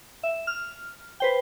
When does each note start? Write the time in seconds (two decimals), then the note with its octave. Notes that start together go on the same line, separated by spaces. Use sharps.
0.23 E5
0.47 F6
1.20 B4 C5 G5